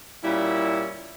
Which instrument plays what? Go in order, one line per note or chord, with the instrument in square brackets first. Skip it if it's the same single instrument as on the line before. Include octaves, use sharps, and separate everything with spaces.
[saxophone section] A#2 G3 C#4 E4